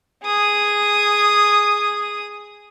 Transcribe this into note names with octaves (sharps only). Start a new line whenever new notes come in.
G#4 D#6